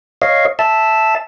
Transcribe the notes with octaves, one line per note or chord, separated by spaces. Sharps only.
C#5 D#5 F5
E5 A5